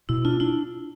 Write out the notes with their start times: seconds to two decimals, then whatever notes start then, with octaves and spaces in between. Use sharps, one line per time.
0.09 B2 E4
0.25 D4 F4
0.40 D4 E4